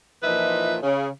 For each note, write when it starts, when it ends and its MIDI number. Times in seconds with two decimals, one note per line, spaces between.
0.23 0.76 46
0.23 0.76 52
0.23 0.76 53
0.23 0.76 63
0.23 0.76 71
0.23 0.76 76
0.83 1.07 49